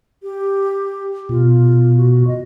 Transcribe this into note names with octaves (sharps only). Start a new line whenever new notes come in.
G4
B2 F4
F#4
D#5